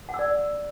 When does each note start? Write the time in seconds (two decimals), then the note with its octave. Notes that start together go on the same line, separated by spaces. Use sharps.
0.09 F#5
0.14 E6
0.19 D5